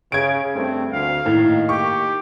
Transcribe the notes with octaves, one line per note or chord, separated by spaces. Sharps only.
C#3 G#6 D7
G2 A3 C4
D2 F5
A2 D#3 A#3
G4 C#6